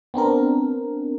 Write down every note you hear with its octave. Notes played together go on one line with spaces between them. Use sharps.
B3 C4 D4 A#4